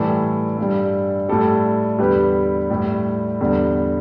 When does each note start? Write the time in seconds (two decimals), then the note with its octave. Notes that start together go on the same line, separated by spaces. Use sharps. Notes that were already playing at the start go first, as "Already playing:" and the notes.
Already playing: A2 E3 G3 A4 D5
0.58 G2 G3
1.29 A2 G3 A4 D5
1.99 E2 D3 G3 G4 B4
2.70 A2 G3
3.41 E2 D3 G3